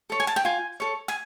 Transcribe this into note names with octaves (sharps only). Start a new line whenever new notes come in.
A4 C#5
G#5
A5
G5
F4 G#5
A4 C#5
G#5